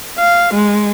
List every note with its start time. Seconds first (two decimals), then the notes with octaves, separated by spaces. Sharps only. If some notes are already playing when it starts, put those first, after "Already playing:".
0.19 F5
0.54 G#3